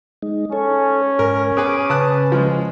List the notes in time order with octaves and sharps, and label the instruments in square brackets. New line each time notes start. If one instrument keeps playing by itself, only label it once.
[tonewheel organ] G#3 D#4
[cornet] C#4 [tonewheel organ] A4 C#5
[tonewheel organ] G#2 [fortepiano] A#4
[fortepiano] B3 G#4 B4 [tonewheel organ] D6 D#6
[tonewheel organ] C#3 B4 [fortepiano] A5 D#6 F#6
[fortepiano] F3 G#3